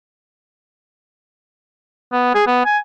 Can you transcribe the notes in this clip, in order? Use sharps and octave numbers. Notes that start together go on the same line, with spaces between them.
B3
G#4
B3
G#5